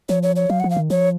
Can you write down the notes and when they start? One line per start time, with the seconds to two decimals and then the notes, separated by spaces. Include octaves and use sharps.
0.09 F3 C#5
0.23 C#5
0.36 C#5
0.50 F#3 F5
0.60 F3 F#5
0.70 F5
0.77 D#3
0.90 F3 C#5